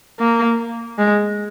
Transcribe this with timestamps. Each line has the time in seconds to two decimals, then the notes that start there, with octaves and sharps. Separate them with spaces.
0.20 A#3
0.98 G#3